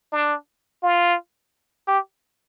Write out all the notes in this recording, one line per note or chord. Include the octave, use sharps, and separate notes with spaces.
D4
F4
G4